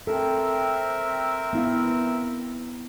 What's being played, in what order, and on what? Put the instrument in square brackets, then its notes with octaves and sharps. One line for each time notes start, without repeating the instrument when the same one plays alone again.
[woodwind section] C4 [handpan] A4 [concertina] A#4 E5
[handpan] B3 E4 F5